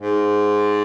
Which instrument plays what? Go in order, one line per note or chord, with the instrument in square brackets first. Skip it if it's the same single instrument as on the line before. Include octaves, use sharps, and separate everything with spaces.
[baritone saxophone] G#2